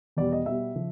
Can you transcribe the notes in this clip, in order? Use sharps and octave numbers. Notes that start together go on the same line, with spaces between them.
E2 B2 G3 D5
D#5
B2 G3 E5
C#3 F3